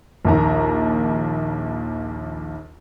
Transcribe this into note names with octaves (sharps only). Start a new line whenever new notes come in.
A#1 D#2 A#5